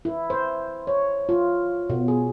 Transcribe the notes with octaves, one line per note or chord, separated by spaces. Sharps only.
E4
C5
C#5
F4
B2
G#4